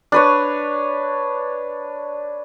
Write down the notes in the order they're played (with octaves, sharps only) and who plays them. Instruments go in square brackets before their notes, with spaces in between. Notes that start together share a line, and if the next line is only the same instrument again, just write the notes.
[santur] D4 B4 C#5